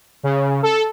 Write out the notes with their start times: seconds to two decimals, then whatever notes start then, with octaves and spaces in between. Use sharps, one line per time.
0.23 C#3
0.63 A4